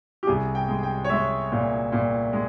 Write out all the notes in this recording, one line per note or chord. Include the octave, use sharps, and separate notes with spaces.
G4
C2 G#4
G5
G#3
G5
C#5
G#3 E5
A#2
A#2
G#3